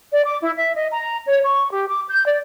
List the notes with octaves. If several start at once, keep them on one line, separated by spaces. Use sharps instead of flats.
D5
D6
E4
E5
D#5
A#5
C#5
C#6
G4
D6
G6
D5